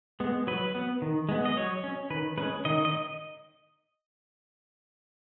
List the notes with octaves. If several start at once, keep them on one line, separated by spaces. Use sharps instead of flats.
G#3 B3
F#3 B4
B3
D#3
G#3 B3
D#5
F#3 C#5
C#4
D#3 B4
G#3 C#4 B4
D#3 D#5
D#5